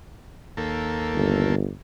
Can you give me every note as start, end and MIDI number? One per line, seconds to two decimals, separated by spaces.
0.57 1.55 39
0.57 1.55 58
0.57 1.55 69
1.14 1.70 31